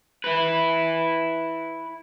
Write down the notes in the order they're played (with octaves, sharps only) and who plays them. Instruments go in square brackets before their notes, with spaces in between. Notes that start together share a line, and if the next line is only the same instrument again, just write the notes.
[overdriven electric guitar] E4 B4